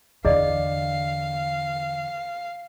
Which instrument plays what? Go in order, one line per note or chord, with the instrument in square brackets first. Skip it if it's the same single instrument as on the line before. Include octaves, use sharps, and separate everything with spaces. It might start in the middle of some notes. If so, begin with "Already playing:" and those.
[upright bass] E2 D3 [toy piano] G#4 D5 D#5 [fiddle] F5